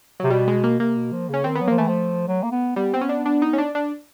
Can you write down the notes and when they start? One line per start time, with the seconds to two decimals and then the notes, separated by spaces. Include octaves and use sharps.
0.20 C3 F#3
0.30 B2 G3
0.47 G#3
0.64 A#3
0.80 C3 A#3
0.96 B2
1.12 F3
1.29 C#3 C#4
1.44 D#3 C4
1.55 B3
1.62 F#3
1.67 F3 A#3
1.78 E3 A3
1.88 F3
2.28 F#3
2.43 A#3
2.52 B3
2.76 G3 B3
2.94 C4
3.01 C#4
3.09 D4
3.26 D4
3.42 D#4
3.53 C#4
3.58 D4
3.75 D4